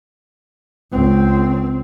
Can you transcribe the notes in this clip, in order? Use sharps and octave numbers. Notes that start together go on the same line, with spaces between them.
C#2 C4